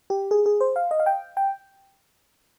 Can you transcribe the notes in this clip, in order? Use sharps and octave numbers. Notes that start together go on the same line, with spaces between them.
G4
G#4
G#4
C5
F5
D#5
F5
G5
G5